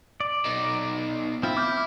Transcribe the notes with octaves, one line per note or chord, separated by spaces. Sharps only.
D5
B2 D#4
C4 E4 F4
D6 F6 G6